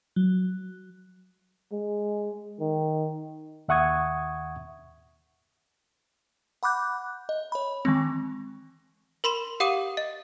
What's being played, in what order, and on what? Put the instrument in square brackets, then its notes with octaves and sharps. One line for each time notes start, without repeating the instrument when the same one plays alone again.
[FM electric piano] F#3
[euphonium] G#3
D#3
[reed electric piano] D#2 E5 F#5 C#6 D#6 G#6
[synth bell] F#5 B5 D6 F#6 G6
D#5
C#5 B5
D#3 E3 G#3 C4
[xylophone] A#4 B5 C6 E7
G4 F5 F#5 D6 D#6 D#7
D#5